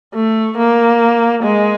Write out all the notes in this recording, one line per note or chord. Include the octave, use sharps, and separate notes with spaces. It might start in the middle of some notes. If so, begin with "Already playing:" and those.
A3
A#3
G#3